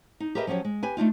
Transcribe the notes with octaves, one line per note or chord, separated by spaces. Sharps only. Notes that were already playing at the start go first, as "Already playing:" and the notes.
D#4
G4 G#4 A#4 B4 D#5 E5
F3 F#3 C#4 G4 C#5
G#3
G4 B4 G#5
A3 D4 D#4 F4